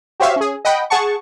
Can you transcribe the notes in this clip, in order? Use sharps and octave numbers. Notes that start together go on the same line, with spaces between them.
F#4 G4 C5 C#5 E5 F5
C#4 G#4
D#5 F#5 G5 B5
G#4 F#5 A5 C#6